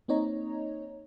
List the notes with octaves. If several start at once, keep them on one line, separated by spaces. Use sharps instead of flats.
A#3 C4 D#4 C#5 D#5 A#5